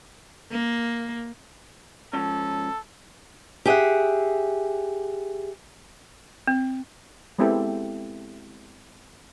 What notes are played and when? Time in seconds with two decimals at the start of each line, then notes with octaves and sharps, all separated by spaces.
0.52 A#3
2.13 G#2 F3 C#4 A4
3.66 G4 G#4 E5 F#5
6.47 C4
7.39 G#3 B3 C4 E4 G4 A4